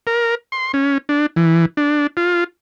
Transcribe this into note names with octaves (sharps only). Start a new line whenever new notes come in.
A#4
C6
C#4
D4
E3
D4
F4